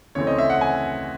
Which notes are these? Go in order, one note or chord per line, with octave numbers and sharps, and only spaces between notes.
D2 C#3 E3 A3 C4 C#5
D#5
E5
F#5
G#5